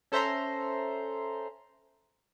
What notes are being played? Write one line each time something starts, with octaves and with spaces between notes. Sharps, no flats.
C#4 A4 C5 E5 A#5 C6